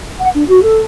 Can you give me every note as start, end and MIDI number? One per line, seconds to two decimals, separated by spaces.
0.19 0.28 78
0.33 0.44 62
0.49 0.62 66
0.63 0.85 69